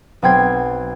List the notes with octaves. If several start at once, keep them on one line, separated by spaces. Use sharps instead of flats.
B1 B3 C4 G5 G#6 C7